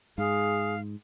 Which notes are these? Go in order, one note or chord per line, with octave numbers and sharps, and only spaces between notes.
G#2 G#4 F5